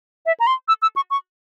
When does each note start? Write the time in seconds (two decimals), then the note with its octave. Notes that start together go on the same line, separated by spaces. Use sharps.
0.26 E5
0.40 A#5
0.47 C6
0.68 E6
0.82 E6
0.96 C#6
1.10 C#6